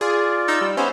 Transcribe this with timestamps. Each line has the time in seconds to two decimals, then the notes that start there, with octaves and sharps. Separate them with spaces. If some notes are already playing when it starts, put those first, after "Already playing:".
0.01 F4 G#4 D5
0.48 D#4 E6
0.62 G3
0.77 B3 C#4 C5 E5 G#5